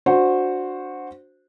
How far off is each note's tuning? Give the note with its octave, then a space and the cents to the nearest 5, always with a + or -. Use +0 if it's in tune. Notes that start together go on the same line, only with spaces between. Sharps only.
D4 +0 F#4 -15 C5 +0